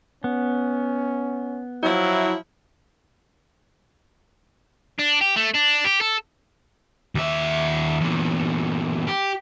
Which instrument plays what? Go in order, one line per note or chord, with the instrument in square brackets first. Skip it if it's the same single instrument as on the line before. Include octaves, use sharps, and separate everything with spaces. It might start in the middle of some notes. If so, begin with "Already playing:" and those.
[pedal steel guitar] B3 [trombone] C#4
[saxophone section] F3 E4 [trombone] F#3
[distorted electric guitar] D4
G4
A3
D4
G4
A4
D#2 E5
E2 A#2
G4